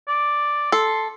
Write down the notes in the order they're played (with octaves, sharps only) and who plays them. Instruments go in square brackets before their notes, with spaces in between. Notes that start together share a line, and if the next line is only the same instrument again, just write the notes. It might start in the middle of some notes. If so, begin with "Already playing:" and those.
[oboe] D5
[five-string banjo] A4 [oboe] C6